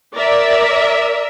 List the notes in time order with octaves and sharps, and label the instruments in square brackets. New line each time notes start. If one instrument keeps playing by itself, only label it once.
[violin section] A#4 E5 [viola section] D5